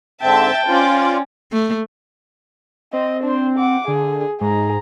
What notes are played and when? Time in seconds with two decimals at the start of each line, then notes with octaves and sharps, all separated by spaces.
0.22 G#2 D3 C4 E5 G5 A5
0.67 C#4 F4 C5 D5
1.52 A3
2.93 C4 D#5
3.23 D4 C5
3.58 F#5 D6
3.88 D3 G#4
4.41 G#2 G#4 A#5